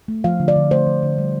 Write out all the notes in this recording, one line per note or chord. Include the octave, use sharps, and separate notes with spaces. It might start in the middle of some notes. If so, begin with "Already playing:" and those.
A3
F3 F5
D3
D5
D3
A3 C5
F3
D3
G3